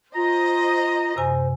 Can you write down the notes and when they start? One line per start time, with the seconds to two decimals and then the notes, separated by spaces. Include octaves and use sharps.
0.15 F4 C5 D#5 A#5
1.16 F#2 C3 C5 G#5